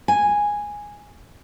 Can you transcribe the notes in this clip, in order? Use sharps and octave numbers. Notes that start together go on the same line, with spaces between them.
G#5